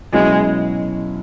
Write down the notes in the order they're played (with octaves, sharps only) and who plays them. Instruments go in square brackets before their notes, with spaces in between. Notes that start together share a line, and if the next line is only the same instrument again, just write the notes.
[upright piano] B2 F#3 C#4 E4 [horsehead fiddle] G#3